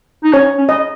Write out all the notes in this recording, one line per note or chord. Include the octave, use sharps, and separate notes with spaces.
D#4
C#4 C#5
C#4
D#5